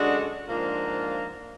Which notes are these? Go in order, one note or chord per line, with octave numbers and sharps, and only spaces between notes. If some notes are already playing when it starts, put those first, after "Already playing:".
Already playing: F#2 D3 G#3 D4 F#4
G#2 F3 A#3 D4 F4